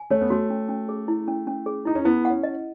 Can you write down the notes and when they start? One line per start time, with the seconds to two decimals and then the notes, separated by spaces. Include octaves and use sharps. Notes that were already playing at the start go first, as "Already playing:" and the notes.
Already playing: G#5
0.10 A3 C#5
0.21 B3
0.30 A3 F#4
0.50 C#4
0.69 C#4
0.89 G#4
1.08 E4
1.28 C#4
1.47 C#4
1.66 G#4
1.85 D#4 E4
1.95 C#4
2.05 B3 E4
2.25 F#5
2.30 C#4
2.43 D#5